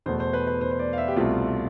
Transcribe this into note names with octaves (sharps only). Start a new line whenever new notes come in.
E2 B2 A3 C5
C5
B4
B4
C5
C5
D5
F5
E5
G4
C2 B2 A3 C4 F4